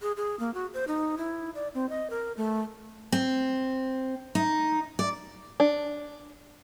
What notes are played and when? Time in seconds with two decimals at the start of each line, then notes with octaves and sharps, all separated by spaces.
0.02 G#4
0.17 G#4
0.39 A#3
0.54 F#4
0.74 C5
0.88 D#4
1.18 E4
1.55 D5
1.74 C4
1.89 D#5
2.10 A#4
2.37 A3
3.12 C4
4.35 D#4
4.99 D5
5.60 D4